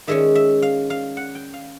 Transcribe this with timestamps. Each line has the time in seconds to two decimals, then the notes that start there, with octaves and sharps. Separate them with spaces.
0.07 D#3 G#3 C#4 E5
0.35 E5
0.62 F5
0.90 F5
1.17 F#5
1.35 G5
1.53 F5